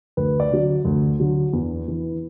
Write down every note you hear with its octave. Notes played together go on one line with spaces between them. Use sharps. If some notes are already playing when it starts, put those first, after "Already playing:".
D2 B4
D5
D3 F#3
D2
D3 F#3
E2
E3